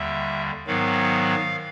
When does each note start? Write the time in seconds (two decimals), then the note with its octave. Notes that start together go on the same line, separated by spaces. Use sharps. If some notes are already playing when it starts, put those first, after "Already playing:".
Already playing: D#2 D3 G3 E5
0.67 G#2 D#3 F#3 B3 F5